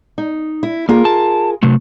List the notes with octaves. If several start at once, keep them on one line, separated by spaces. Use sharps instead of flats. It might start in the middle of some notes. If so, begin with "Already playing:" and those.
D#4
E4
A#3 F4 G#4 A#4
A5
C3 F#3 A3